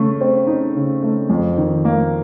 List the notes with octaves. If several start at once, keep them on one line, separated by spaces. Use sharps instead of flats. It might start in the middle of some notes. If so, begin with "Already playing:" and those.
Already playing: C#3 A3
C4
D#4
C#3
A3
F2
D#3
A#3